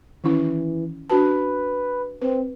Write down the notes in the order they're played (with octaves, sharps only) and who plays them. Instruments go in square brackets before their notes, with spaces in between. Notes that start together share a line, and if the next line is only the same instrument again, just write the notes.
[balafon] D#3 C#4 E4 [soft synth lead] E3
[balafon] D4 F#4 A5 [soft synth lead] B4
[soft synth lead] C4 [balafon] B4